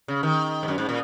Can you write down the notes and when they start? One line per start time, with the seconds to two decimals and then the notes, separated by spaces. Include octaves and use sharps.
0.08 C#3
0.23 D#3
0.63 G#2
0.68 F#2
0.78 G#2
0.89 A#2